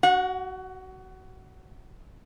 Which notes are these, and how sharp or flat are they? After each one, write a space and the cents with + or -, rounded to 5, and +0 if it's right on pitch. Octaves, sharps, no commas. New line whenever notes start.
F#4 +20 F#5 -20